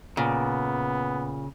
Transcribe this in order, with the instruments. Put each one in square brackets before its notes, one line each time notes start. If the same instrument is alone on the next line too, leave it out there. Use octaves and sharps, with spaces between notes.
[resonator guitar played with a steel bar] A#2 [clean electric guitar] C#3 [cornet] B3